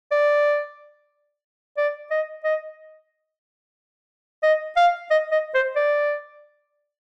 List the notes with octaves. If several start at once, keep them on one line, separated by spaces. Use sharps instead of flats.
D5
D5
D#5
D#5
D#5
F5
D#5
D#5
C5
D5